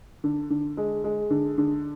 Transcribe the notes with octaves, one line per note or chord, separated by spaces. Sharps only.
D3
D3
G#3
G#3
D3
D3